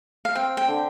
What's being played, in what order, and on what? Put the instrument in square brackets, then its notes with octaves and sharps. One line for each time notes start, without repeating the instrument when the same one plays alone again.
[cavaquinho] F5
[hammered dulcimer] C4 [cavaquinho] G5
[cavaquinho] G5
[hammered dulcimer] D3